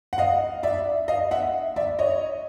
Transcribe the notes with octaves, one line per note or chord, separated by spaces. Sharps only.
F#5
D#5 F5
D5 E5
D#5 F5
E5 F#5
D5 E5
C#5 D#5